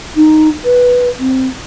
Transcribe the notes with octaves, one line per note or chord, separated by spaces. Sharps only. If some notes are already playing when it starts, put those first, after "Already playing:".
D#4
B4
C4